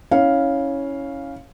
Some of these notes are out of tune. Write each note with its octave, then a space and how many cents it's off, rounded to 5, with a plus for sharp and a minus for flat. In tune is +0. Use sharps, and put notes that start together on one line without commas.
C#4 +0 E4 -25 F5 +0